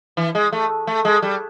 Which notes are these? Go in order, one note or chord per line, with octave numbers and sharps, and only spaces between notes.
E3
G#3
A3
A3
G#3
G3